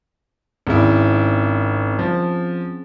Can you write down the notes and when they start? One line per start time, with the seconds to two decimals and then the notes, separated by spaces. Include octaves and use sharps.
0.67 G#1 C4 C#4 E4 G#4
1.99 F3